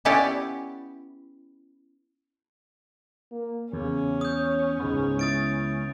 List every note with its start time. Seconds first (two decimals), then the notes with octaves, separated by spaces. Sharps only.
0.05 B3 C#4 E4 G4 D5 F#5
3.31 A#3
3.73 E2 C#3 C#4
4.21 C#5 D#6 G6
4.80 C#2 G#2 B3
5.19 E4 D#6 A6 D7